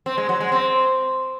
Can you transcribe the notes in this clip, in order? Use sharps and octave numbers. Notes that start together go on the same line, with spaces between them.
C4
G#3
F#3
G#3
C4